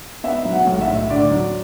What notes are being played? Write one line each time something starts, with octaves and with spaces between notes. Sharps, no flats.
B3 E5
F#3
F#5
B1
E5
A2
D2 D5
F#3